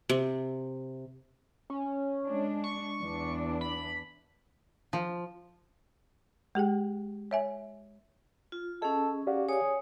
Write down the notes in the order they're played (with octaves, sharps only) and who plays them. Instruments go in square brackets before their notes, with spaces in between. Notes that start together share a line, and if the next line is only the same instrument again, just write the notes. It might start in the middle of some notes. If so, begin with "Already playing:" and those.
[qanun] C3
[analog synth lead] C#4
[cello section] G#3 D4
[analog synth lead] C#6
[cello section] E2 E3 D4
[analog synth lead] B5
[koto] F3
[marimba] G#3 G4 G#4 G5
C#5 E5 G#5
[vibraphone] F4
[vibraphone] C#4 G#4 [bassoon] A4 [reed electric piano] D#5
[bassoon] F#4 [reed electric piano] G4 D5 F5
[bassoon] G#4 [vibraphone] C#5 D#6